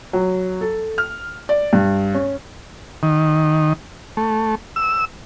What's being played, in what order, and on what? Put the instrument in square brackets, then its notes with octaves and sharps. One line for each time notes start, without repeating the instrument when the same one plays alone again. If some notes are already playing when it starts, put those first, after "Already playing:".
[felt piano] F#3
A4
F6
D5
G2
C#4
[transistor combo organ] D#3
A3
E6